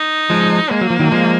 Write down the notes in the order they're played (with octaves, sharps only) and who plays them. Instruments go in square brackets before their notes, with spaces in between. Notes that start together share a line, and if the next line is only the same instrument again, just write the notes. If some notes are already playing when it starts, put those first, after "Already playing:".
Already playing: [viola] D#4
[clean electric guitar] F3 G#3
[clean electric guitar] G#3 [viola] A#3
[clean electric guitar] F#3
F3
D#3 F#3
F3 G#3